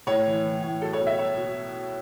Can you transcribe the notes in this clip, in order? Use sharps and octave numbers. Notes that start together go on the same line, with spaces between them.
A2 C#5
E3
E3
A2
F#3 A4
C#5
B2
E5
F#3 C#5
B2